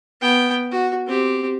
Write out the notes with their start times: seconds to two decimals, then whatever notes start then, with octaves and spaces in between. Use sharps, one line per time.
0.21 B3 G5
0.71 F#4
1.07 C4 G4